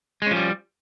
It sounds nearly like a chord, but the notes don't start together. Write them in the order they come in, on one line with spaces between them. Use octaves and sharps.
G#3 C#4 F3 G3